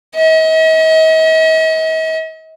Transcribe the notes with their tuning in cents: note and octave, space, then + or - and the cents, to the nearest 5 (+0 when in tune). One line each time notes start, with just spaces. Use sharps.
D#5 +45